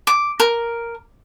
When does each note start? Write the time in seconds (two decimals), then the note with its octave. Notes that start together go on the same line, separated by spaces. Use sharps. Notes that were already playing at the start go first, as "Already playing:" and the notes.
0.07 D6
0.40 A#4